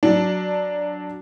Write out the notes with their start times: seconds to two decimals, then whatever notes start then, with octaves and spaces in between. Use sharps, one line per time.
0.03 F#3 D4